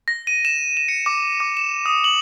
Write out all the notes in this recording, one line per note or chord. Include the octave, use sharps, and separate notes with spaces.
A#6
D#7
E7
E7
C#7
D6
D6
E7
D#6
F#7